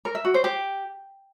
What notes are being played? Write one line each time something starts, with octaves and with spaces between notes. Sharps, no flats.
A#4
E5
F#4
C5
G4